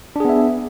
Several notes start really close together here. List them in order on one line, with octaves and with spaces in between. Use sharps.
D4 G#4 B3 E5